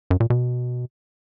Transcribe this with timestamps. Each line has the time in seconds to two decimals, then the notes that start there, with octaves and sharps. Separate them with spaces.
0.11 F#2
0.20 A#2
0.30 B2